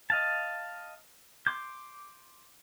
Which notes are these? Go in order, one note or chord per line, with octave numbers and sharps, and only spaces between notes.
D#5 F5 A5
C6 D6 G6